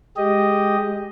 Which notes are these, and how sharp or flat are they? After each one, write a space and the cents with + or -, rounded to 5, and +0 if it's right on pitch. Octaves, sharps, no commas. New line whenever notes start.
G#3 +0 G4 +0 D#5 +0